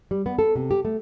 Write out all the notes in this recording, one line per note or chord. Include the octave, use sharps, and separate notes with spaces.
G3
B3
A4
C3
G4
A3